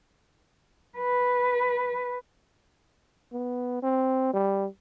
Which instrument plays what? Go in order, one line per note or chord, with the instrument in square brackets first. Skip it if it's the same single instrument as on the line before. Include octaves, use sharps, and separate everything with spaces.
[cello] B4
[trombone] B3
C4
G3